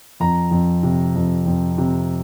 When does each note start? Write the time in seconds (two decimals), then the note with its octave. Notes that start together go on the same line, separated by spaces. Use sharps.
0.20 F2 A#5
0.51 F2
0.83 C3
1.15 F2
1.46 F2
1.78 C3